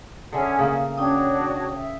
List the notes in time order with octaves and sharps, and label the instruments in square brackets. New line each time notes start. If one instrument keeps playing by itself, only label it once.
[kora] D3 E5 [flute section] C#4 G#4 G#5
[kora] C#3 A#3
[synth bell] C#4 G5 D#6 [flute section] D4 F#4 C#5
[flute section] E5